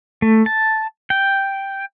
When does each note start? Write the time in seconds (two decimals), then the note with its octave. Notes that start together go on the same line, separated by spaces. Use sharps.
0.22 A3
0.46 A5
1.10 G5